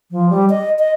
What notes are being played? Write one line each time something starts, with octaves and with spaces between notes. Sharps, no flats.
F3
G3
D#5
D#5